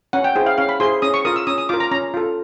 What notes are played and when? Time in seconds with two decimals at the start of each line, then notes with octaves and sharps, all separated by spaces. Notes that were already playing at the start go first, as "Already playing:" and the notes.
0.13 C#4 F#5
0.24 G5
0.36 E4 G#4 C5 G5
0.46 F5
0.58 C#4 F5
0.69 B5
0.80 E4 G#4 C5 C6
1.02 C#4 D#6
1.14 C#6
1.25 F4 A#4 D#6
1.36 E6
1.47 C#4 D#6
1.58 D#6
1.69 F4 A#4 D6
1.80 A#5
1.92 C#4 A#5
2.14 F4 A4